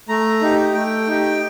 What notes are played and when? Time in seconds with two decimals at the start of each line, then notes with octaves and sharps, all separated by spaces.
0.09 A3 A#5
0.41 D#4 G4
0.74 A3 G5
1.07 D#4 G4